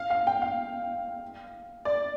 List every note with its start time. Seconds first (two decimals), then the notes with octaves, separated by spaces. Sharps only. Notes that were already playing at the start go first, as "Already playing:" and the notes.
Already playing: F5
0.10 F5
0.27 G5
0.42 F5
1.85 D5